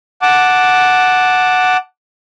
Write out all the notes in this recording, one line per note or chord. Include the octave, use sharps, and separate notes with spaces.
F#5 A5 D6